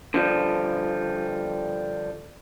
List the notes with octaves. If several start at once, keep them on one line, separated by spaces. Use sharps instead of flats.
D3 F3 G3